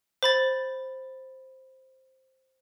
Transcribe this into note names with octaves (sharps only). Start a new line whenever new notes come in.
C5 B5 A6